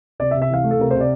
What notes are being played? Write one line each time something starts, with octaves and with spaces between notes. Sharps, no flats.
C3 D5
E5
C3
E5
E3 F5
A3
A4
C3 A#4
C3 C5
D5